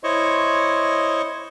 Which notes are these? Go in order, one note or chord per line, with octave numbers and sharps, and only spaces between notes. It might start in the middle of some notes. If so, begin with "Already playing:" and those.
E4 C5 C#5 D#5 C#6